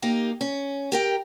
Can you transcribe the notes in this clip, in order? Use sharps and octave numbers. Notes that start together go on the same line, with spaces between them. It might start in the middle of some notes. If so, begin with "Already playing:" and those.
A#3 D#4 G4
C#4
G4 A#4 G5